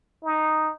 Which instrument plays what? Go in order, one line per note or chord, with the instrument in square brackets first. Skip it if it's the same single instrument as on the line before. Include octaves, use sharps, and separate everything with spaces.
[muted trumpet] D#4